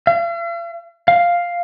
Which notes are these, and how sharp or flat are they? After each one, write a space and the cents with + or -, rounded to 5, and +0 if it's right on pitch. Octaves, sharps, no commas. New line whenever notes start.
F5 -45
F5 +0